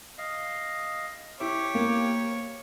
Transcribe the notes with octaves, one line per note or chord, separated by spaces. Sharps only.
D#5 F5
E4 G4 C#5 D6
A#3